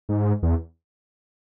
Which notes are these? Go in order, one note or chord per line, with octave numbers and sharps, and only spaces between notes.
G#2
E2